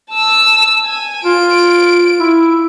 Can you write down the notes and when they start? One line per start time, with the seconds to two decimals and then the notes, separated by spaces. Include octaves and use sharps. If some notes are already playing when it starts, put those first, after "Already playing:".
0.11 A5 E6
0.85 G#5
1.24 F4 D7
2.20 E4